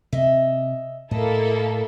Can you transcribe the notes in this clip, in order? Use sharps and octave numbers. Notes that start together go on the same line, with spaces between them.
C3 C4 D#5 E5
A2 A#3 E4 A4 D#5